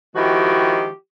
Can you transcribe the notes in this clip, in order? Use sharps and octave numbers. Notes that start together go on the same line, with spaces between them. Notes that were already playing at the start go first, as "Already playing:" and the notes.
D#3 F3 G#3 E4 F#4 G4